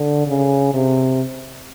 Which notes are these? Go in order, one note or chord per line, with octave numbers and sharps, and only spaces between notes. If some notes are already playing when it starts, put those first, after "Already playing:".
Already playing: D3
C#3
C3